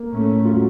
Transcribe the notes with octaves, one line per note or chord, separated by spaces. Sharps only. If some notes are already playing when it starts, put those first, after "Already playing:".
Already playing: A#3
A2 A3 C#4
F4
F#3